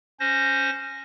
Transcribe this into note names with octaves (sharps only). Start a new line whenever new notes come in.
C#4 C5 A#6